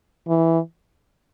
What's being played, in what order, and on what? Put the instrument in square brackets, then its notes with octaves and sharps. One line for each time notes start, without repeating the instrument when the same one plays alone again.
[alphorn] E3